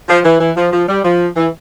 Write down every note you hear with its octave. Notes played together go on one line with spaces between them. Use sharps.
F3
E3
E3
F3
F3
G3
F3
E3